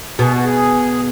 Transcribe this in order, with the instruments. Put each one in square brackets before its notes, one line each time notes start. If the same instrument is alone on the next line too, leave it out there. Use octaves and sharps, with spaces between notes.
[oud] B2 [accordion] G#4
[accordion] F#4
G#4